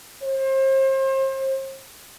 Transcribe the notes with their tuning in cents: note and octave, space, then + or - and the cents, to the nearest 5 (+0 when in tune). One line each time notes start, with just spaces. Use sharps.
C5 +35